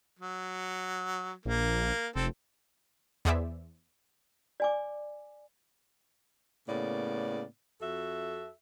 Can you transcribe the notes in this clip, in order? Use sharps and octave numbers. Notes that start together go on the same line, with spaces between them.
F#3
A#1 A#3
F1 C4 A4
E2 B3 G#4 C5 D5 E5
D5 G#5 D6
A2 C#3 A#3 B3 D5
F2 F#4 A4 E5